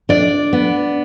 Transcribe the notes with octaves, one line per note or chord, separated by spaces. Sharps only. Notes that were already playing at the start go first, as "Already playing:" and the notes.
D4 D5
B3